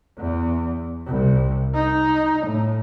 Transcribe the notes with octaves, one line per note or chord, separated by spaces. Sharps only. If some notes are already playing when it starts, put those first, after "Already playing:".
E2
C2
D#4
A2